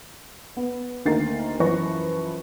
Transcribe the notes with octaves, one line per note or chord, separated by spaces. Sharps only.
B3
D2 D#3 A#3 A#5 A6 C7
F#2 E3 F3 B4 C#6 A#6